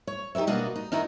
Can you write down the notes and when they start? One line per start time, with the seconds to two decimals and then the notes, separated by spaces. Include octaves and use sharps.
0.07 C#5
0.35 D#4 G4 A#4 C#5 E5
0.47 B2 A#3 B3 D4 F#4 D#5
0.76 D#4
0.92 F#2 D#3 D#4 E4 F#4 A#4